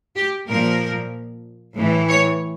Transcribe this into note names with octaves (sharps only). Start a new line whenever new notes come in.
G4
A#2 F3 A#4
A2 E3
C#5